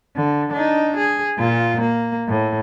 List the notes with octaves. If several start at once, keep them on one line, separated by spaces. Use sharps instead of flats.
D3
D4 D#4
G#4
A#2 F4
A#3
A2